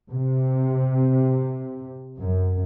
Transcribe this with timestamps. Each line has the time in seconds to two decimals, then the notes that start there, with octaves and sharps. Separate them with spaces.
0.10 C3
2.18 F#2